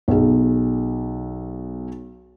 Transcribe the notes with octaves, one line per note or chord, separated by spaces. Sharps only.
B1 G#4